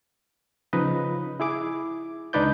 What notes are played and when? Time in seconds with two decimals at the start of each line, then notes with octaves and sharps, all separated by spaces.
0.73 C#3 F3 D#4 B4 D#5
1.40 E4 G#4 D6
2.33 C#2 D4 D#4 B4 D5 G6